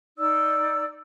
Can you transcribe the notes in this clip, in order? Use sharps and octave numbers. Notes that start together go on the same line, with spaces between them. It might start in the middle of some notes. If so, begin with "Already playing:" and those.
D#4 D5 E6